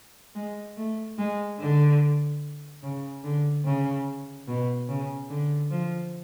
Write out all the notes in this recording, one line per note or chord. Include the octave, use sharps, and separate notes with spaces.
G#3
A3
G#3
D3
C#3
D3
C#3
B2
C#3
D3
F3